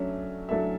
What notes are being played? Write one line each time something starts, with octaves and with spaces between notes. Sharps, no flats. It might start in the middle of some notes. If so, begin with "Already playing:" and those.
Already playing: F#3 A3 C#4 D4 E5
F#3 A3 D4 A4 E5